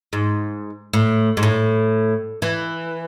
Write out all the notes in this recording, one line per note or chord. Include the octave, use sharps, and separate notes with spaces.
G#2
A2
G#2
A2
E3